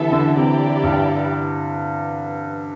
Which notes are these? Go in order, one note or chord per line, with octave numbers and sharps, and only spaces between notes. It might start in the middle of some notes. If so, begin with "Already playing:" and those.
Already playing: D3 E3 G3 B3 E4 A4 E5
D3
C3 E4 G4 D5
G2